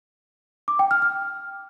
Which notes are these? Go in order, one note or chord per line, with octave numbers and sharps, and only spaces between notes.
D6
G5
F6
F6